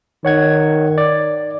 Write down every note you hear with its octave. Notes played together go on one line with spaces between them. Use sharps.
D#3 C#5 F#5 G#6
D5